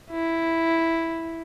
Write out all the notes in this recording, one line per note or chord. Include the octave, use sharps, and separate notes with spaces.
E4